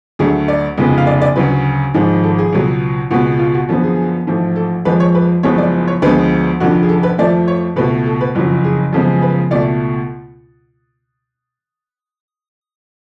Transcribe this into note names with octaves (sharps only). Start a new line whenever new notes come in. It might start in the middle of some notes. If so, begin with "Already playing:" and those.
D2 D3 F#3 A3 G#4
D5
F1 F2 C#3 G#3 B3
F5
D5
D5
D2 C#3 F#3 B4
G#1 G#2 F3 G#3
A4
G#4
C#2 B2 F#3 B3
C#2 B2 G#3 B3 F#4
F4
F#4
F#2 D3 F3 B3
G#4
A1 G#2 F3 A3
A4
F2 F3 G#3 B4
C#5
B4
F#1 F#2 F3 G#3 B3 C#5
D5
C#5
D2 D3 F3 G#3 B3 B4
F1 F2 D3 F#4
G#4
A4
B4
F2 F3 A3 D5
C#5
C#2 B2 A3 B4
A4
B4
F#1 F2 C#3 F#3
G#4
F#2 C#3 F3 G#3 B3 A4
B4
C#2 B2 A3 D5